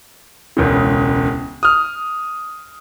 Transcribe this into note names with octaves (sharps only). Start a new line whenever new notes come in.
E1 C#2 C#3
D#6 F6